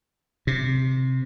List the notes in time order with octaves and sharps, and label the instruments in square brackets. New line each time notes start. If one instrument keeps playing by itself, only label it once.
[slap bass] C3